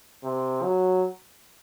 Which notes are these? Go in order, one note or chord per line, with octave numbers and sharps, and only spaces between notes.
C3
F#3